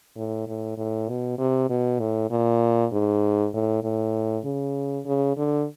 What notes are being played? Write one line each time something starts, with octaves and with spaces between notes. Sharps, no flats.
A2
A2
A2
B2
C3
B2
A2
A#2
G#2
A2
A2
C#3
C#3
D3